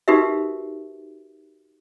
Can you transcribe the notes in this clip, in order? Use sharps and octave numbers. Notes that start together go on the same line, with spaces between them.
D#4 F#4 G4 A#4 B4 E5